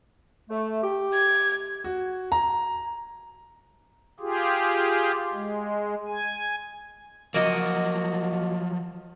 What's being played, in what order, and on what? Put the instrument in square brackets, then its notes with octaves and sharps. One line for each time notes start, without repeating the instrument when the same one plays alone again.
[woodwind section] A3
G4
[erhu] G#6
[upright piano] F#4
A#5
[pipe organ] F4 G4 G#4
G#3
G#5
[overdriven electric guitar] F3 F#3 [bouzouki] A#3 F#4 D#5